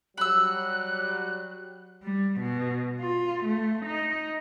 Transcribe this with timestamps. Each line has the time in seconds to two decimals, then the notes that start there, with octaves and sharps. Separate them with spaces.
0.17 F#3 G3 B5 E6 F#6
2.03 G3
2.41 B2
3.01 F4
3.44 A3
3.86 D#4